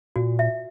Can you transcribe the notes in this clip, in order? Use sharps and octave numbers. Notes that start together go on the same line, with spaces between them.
A#2 F#4
E5